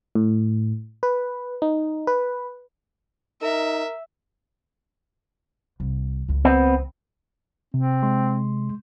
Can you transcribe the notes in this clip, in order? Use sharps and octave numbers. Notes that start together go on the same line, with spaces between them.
A2
B4
D#4
B4
D#4 A#4 E5
C2
C#2 E3
B3 C4
C3 C4
G#3 C6